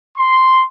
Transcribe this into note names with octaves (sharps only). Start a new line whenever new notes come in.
C6